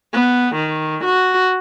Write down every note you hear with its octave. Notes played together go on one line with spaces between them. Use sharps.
B3
D#3
F#4